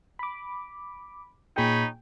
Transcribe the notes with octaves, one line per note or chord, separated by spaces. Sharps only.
B5 D6
A#2 D#4 G#4 C#5 G5 B5